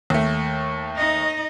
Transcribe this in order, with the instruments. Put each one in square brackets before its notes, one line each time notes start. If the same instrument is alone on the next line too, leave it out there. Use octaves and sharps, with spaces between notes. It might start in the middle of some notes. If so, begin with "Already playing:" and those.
[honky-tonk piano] D#2 A3
[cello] D#4 D#5